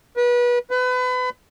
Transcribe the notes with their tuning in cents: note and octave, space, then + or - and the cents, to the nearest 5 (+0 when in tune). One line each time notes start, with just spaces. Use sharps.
B4 -30
B4 +30